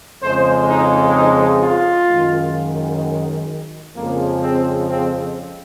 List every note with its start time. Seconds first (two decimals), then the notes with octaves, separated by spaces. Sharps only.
0.22 F2 C#3 G#3 C5
0.68 D#4
1.15 D#4
1.62 F4
2.09 F#2 D#3 G#3
3.96 F2 C#3 F3 G#3 A#3
4.42 C4
4.89 C4